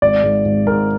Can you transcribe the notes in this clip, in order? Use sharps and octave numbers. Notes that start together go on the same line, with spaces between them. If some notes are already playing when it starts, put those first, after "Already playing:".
G#1 D5
G#2
G#1
G#2 A#4